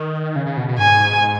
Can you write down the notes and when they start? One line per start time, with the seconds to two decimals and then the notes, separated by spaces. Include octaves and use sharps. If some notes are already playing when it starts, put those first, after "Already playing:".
Already playing: D#3
0.36 C#3
0.46 C#3
0.57 B2
0.68 B2
0.79 G#2 G#5